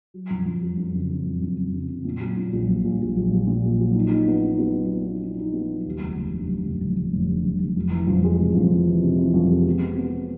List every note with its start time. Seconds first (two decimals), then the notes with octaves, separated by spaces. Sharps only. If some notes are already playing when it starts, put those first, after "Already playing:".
0.14 F#3
0.30 F2
0.46 F2
0.62 F#3
0.77 F2
0.94 C#3
1.10 C#3
1.25 F2
1.42 F2
1.57 F2
1.74 C#3
1.89 C#3
2.04 A#2
2.20 F#3
2.37 A#2
2.53 A#1
2.68 A#1
2.84 A#1
3.00 A#1
3.16 A#1
3.32 A#1
3.47 A#2
3.63 A#1
3.80 F#3
3.95 D#4
4.11 D#4
4.28 B3
4.43 D#4
4.59 B3
4.74 F#3
4.90 B3
5.06 D#4
5.22 D#4
5.38 D#4
5.53 B3
5.69 F#3
5.85 D#2
6.01 F1
6.17 F1
6.34 D3
6.48 F1
6.65 F1
6.81 F1
6.96 F1
7.12 F1
7.28 D3
7.44 F1
7.60 F1
7.76 F2
7.91 E3
8.07 F2
8.24 G#3
8.40 C3
8.55 F2
8.72 E3
8.87 E3
9.03 C3
9.19 E3
9.34 F2
9.51 G#3
9.67 B2
9.82 B3
9.98 B3